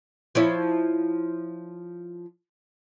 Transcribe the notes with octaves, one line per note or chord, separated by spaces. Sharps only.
F3 E4 C#5